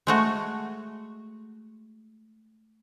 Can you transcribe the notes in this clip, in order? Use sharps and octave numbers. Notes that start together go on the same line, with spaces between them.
G#3 A3 F#4